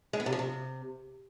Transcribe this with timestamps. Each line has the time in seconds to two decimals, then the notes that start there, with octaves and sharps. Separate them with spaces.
0.13 G#3
0.20 B3
0.26 C3
0.32 F3
0.39 C3